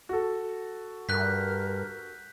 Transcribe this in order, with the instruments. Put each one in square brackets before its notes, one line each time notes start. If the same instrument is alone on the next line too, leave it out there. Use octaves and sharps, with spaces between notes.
[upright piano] F#4 A4
[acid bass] G2 [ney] A#4 [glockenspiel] F#6 G6 B6